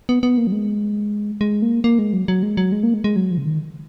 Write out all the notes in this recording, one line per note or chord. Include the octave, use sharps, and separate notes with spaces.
B3
B3
A#3
F#3
G#3
G#3
A#3
A#3
G#3
F#3
F#3
G#3
F#3
G#3
A#3
G#3
G#3
F#3
F3
C#3
D#3